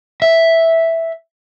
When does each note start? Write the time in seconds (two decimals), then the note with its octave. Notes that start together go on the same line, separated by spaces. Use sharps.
0.22 E5